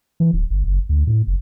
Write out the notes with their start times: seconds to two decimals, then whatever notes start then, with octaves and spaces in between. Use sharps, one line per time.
0.20 E3
0.33 D1
0.50 G1
0.64 F#1
0.89 D2
1.07 A2
1.27 F#1